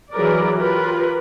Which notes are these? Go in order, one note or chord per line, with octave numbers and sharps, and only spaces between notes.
E3 F#3 G#4 A#4 B4 D5
F4 G4 A#4 B4